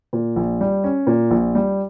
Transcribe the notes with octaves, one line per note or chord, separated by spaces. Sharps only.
A#2
A#1
G3
C#4
A#2
A#1
G3